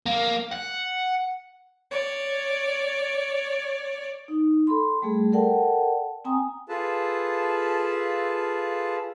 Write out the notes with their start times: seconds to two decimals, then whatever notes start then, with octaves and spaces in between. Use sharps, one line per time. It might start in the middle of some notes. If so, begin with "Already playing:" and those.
0.06 A#3
0.53 F#5
1.91 C#5 D5
4.28 D#4
4.67 A4 B5 C6
5.02 G3 A3 G#4
5.32 A4 A#4 D5 F#5 G5 A5
6.25 C4 G5 G#5 A#5 D#6
6.69 F4 G#4 A4 B4 A5